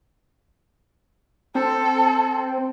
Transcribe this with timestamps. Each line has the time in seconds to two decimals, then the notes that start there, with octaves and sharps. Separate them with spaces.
1.55 C4 A4